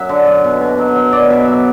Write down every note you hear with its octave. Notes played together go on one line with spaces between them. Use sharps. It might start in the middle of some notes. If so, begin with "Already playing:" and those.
Already playing: F#2 F#3 E5
D3
F#2
B2
B2
F#3
F#3
B2 D5
B2 E5
F#3 E5